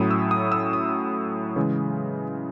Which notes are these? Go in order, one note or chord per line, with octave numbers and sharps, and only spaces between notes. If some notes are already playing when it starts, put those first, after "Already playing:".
Already playing: A2 F#3 C#4 E4 D#6
E6
D#6
E6
D#6
C#3 E3 G#3